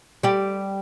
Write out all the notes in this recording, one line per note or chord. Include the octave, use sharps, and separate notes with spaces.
G3 G4